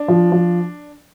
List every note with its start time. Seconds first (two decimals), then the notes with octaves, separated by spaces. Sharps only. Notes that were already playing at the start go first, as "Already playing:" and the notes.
Already playing: D4
0.08 F3
0.32 F3